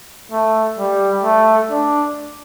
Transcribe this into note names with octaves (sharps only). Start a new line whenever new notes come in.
A3
G3
A3
D4